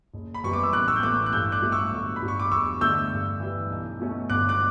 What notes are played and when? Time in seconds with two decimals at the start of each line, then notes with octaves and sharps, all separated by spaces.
0.14 F#1
0.34 B5
0.44 F#2 E3 G3 B3 C#6
0.53 D6
0.63 E6
0.73 A1 D6 F#6
0.88 C#6 E6
0.96 G6
1.03 A2 E3 A3 D6 F#6
1.26 F#6
1.32 G2 E6 G6
1.52 D6 F#6
1.62 F#3 A3
1.72 C#6 E6
1.92 G1
2.16 B5
2.21 G2 F#3
2.28 C#6
2.40 D6
2.51 E2 C#6 E6
2.81 D3 A3 D4 E6 G6
3.11 G2
3.40 E3 G3
3.70 B1
4.00 B2 F#3 A3 C#4
4.29 G1 D6 F#6
4.49 D6 F#6